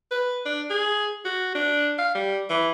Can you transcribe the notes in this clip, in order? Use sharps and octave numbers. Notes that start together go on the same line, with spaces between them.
B4
D4
G#4
F#4
D4
F5
G3
E3